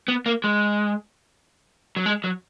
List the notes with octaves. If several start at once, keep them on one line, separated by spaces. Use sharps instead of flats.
B3
A#3
G#3
F#3
G#3
F#3